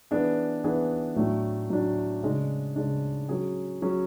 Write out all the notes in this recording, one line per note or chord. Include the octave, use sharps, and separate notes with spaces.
E3 B3 D4 G#4
E3 B3 D4 G#4
A2 F#3 A3 D4
A2 F#3 A3 D4
C#3 G#3 D4
C#3 G#3 D4
F#3 C#4 G#4
F#3 C#4 G#4